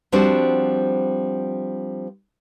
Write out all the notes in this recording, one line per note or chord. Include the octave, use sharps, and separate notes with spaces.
F3 G3 C4 D4 F#4 C5